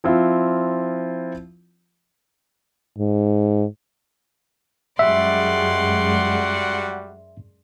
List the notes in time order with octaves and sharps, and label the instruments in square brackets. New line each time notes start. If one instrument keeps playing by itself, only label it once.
[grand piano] F3 C4 E4 F4
[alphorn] G#2
[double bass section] F#2 G#3 [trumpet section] G3 F#4 F#5 [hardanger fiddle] D5 C6 [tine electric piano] E5